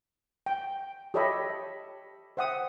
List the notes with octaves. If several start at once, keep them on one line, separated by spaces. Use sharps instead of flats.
G5
G4 A4 C#5 D#5 E5 B5
C5 E5 F#5 G5 D#6